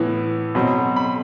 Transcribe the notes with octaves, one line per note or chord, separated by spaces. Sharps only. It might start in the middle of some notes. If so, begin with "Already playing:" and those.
Already playing: A2 E3 B3
B2 F#3 C4
B5